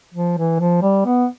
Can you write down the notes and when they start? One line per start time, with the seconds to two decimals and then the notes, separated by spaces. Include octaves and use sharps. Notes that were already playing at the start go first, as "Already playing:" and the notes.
0.14 F3
0.38 E3
0.60 F3
0.82 G3
1.05 B3